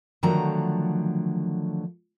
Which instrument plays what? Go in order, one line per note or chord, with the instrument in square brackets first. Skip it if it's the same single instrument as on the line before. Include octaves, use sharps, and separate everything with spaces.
[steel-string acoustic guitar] D3 D#3 F3 F#3 A3 A#5